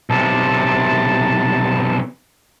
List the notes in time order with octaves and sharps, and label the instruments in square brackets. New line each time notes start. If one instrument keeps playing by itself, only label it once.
[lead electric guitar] B1 C3 [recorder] A5